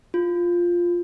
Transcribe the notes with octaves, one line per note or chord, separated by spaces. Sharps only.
F4